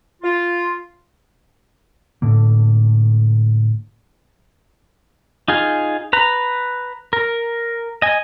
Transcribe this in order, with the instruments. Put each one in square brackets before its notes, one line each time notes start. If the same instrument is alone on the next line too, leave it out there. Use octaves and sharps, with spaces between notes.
[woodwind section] F4
[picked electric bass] A2 D3 A#3
[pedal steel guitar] D#4 F4 G#4
B4 A#5
A#4
D#5 G#5